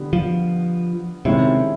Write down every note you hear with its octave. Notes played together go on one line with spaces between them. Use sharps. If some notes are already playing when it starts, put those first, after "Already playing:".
Already playing: D3 G3 B3
F3
C3 D#3 G#3 C#4 E4